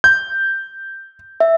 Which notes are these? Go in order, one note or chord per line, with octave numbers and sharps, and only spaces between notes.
G6
E5